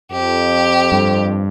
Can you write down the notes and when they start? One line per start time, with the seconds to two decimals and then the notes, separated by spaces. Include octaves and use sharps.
0.12 F2 G4
0.92 G2